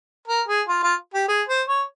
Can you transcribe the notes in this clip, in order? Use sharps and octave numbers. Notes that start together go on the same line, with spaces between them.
A#4
G#4
F4
F4
G4
G#4
C5
C#5